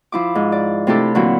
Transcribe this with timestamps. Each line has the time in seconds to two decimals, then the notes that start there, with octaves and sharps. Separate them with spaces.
0.12 F3 E4 D6
0.35 G#2
0.52 D5
0.87 C3 A3 D4 E4 G4 A4
1.15 A#2 D3 E3 F#3 C4 E4